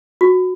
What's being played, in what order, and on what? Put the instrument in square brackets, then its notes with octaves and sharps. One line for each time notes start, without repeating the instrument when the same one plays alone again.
[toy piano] F#4